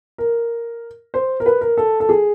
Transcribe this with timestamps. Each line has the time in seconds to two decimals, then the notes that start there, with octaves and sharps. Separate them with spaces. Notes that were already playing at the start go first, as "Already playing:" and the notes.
0.18 A#4
1.14 C5
1.40 A#4
1.46 B4
1.61 A#4
1.77 A4
2.00 A4
2.09 G#4